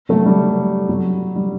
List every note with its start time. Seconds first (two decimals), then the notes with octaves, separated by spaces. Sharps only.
0.09 F#3 A3
0.26 G3
0.89 F#3
1.36 G3